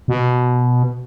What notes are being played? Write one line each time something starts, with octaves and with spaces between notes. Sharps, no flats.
B2